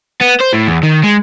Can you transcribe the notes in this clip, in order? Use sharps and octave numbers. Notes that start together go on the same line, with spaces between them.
B3
C5
A2
E2
D#3
G#3